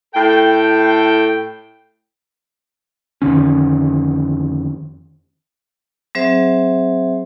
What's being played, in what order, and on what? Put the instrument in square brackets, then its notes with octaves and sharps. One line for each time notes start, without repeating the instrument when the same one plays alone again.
[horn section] A2 A4 G5
[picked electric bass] F2 D3 D#3 C#4
[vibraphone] F#3 C4 G#4 C5 E5